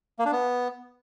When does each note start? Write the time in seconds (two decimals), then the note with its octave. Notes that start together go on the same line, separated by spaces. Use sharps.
0.19 A#3
0.25 D4
0.32 B3